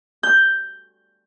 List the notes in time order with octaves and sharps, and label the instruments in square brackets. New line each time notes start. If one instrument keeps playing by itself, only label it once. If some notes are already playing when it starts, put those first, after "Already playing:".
[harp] G6